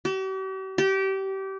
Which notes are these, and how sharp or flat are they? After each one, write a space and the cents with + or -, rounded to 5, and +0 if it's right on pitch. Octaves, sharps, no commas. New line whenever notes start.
G4 -45
G4 -25